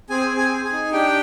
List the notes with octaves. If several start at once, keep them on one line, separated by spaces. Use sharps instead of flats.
C4 G#4 G#5
C4
G#4 G#5
G#4
G#4 G#5
D#4
D4 G4 G5